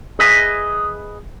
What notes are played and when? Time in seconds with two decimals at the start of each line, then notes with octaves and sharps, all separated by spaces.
0.19 G#4 B4 D#5 E5 G#5